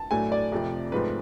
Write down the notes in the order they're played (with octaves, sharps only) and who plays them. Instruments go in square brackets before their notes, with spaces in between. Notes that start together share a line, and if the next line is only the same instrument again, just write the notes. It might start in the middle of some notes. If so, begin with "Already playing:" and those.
Already playing: [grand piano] A5
[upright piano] A2 F#3 A3 D4 [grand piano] G#5
[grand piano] D5
[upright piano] F2 C3 F3 A3
[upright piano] G#2 F3 A3 C4 [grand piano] B4